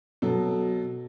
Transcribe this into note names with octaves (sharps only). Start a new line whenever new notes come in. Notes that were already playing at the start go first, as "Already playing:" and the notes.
B2 F#3 A4